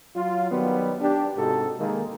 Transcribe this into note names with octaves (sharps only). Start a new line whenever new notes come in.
F#3 F4
D#3 F#3 G3 B3
D4 G4
G#2 C3 D#4 F#4 A4
D#3 G#3 A#3